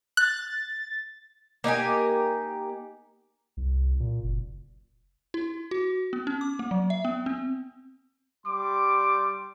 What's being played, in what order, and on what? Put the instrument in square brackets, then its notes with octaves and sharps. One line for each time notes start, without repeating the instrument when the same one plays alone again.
[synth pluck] F#6 [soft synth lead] A6
[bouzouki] A#3 D#4 G4 G#5
[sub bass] C2
A#2
F#1
[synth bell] E4
F#4
B3
C#4
D6
A#3
F#3
E5
B3
C4
[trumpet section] G3 C6 D6